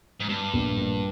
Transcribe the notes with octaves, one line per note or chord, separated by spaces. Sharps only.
G#2
G2 G3
A#1
A#2